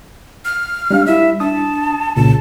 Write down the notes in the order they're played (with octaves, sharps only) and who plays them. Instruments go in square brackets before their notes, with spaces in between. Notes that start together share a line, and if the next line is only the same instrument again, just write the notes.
[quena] F6
[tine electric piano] G3 D4 F5
[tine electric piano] G3 E4 [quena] E5
[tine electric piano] D4 D#6 [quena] A5
[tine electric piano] C2 A#2 C#3 [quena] A5